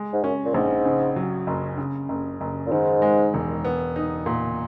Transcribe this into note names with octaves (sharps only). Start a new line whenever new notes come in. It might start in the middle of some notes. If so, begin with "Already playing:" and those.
Already playing: G#3
G#2
F#2 C#4
A#2
A#1 G#2
C#3
F#3
F#1
C#3
F#1
F#1
A#2
G#2 D#3
G#3
E1
B3
D#4
A#2